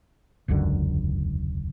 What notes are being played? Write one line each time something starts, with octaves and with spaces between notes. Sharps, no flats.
E1 C#2 F#2 D3